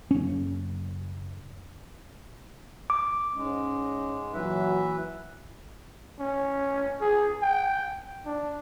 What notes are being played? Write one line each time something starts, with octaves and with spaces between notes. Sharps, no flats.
F#1 C#4
D6
G#2 G#3 C#4
A#2 E3 F#3 B4 E5
C#4
G#4
G5
D4